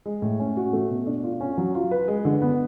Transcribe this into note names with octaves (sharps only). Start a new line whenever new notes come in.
G#3
A2
C#4
F#4
A3
B2
D4
F4
C#4
F#3
F4
B4
G#3
D3
B3